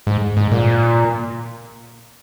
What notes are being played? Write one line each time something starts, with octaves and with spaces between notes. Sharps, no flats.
G#2
G#2
A#2